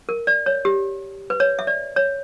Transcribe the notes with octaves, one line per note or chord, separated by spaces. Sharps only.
A#4
D5
C#5
G4
B4
C#5
E5
D5
C#5